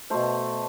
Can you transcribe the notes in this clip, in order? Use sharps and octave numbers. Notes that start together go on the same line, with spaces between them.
B2 A3 C5